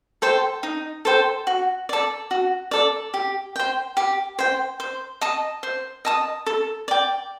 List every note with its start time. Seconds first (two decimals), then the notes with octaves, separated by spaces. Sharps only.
0.22 A4 C5 G5
0.63 D#4
1.05 A4 C5 G5
1.47 F#4
1.89 A4 D5
2.31 F#4
2.71 A4 D5
3.14 G4
3.56 C5 G5
3.97 G4
4.39 C5 G5
4.80 C5
5.21 D#5 A5 D#6
5.63 C5
6.05 D#5 A5 D#6
6.46 A4
6.88 D5 G5